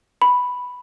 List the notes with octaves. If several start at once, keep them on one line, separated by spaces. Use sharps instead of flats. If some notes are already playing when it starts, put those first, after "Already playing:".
B5